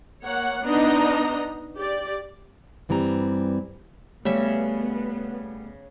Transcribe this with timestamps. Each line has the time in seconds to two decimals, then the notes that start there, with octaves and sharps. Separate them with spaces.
0.24 A#3 C#5 F#5
0.64 B3 D4 D#4 D#5 A#5
1.75 G4 D5
2.89 G2 E3 G3 C4 A#5
4.25 C#3 G3 A3 B3 C#4 E5